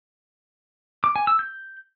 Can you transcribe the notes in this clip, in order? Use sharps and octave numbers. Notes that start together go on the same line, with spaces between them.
D6
G#5
E6
G6